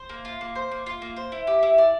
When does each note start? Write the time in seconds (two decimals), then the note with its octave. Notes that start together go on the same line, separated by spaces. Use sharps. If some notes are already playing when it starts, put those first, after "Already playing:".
Already playing: C5
0.09 A#3
0.25 F4
0.41 A#3
0.55 C5
0.71 A#3
0.86 F4
1.02 A#3
1.17 C5
1.32 E4
1.47 G4
1.63 E4
1.78 D5